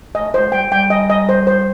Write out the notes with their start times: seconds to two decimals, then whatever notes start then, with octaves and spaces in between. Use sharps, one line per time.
0.15 A3 D#5
0.34 G#3 C5
0.52 G3 G5
0.71 G3 G5
0.90 D#5
1.10 D#5
1.29 C5
1.47 C5